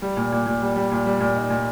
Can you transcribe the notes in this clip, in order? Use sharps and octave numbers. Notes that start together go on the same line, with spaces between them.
G3
A#2
A#2
A#2
G3
G3
A#2
G3
A#2
D#4
A#2